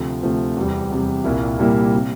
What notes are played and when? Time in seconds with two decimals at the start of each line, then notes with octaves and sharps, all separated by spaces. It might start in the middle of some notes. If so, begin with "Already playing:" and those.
Already playing: D2 C3 F3 A3
0.23 D2 C3 F3 A3
0.56 E2 C3 G3
0.90 E2 C3 G3
1.24 C2 A#2 G3 A#3 E4
1.59 C2 A#2 G3 A#3 E4
1.94 C3